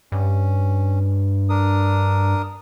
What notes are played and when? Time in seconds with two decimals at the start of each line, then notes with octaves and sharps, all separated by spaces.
0.12 G2 C#4
1.49 D4 A#4 D#6